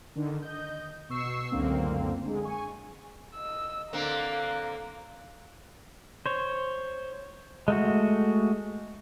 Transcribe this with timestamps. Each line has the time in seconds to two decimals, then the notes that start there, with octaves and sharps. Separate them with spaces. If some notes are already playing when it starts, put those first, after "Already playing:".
0.16 D3 D#3
0.42 D#5 G6
1.10 B2 C#6 E6 C7
1.51 C#2 F#2 A2 D3 A#3 C4
2.25 D3 G#3 G#4
2.43 G#5 C#6
3.35 D#5 E6
3.93 D3 A#3 C4 F5 A#5
6.26 C5 C#5
7.68 G#3 A3 F#4